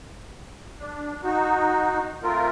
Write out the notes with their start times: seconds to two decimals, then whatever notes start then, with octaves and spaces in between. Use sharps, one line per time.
0.79 D4
1.23 D#4 F#4
2.23 A3 C4 F4 A#4